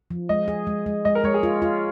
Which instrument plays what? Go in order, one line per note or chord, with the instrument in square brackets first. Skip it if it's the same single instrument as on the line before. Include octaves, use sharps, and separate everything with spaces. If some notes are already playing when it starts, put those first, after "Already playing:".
[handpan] F3
[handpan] G#3 [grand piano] D#5
[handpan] G#4
G#3
G#3
[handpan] G#3 [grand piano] D#5
[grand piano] A#4
[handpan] G#3 [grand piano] C#5
[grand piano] G#4
[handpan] F4
F4